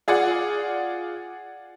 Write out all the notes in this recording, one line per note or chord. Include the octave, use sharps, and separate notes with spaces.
F4 G#4 D5 F#5